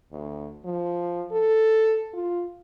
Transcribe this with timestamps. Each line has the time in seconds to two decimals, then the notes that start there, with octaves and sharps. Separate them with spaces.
0.12 D2
0.65 F3
1.32 A4
2.13 F4